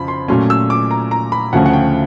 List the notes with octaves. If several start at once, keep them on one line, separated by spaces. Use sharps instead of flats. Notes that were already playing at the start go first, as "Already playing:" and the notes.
Already playing: F2 C#3 F3 B5
C6
A#2 F#3 A3 C#4 C6
E6
D6
A#5
A#5
B5
D2 C#3 F3 A3 C#4 F#5
F#5
G5